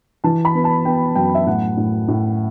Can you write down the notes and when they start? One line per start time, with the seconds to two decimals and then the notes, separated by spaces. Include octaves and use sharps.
0.24 E3 A5
0.45 B5
0.55 B3
0.64 A5
0.85 B3 G5
1.16 F#2 G5
1.35 E5
1.46 A2 F#5
1.77 A2
2.08 A2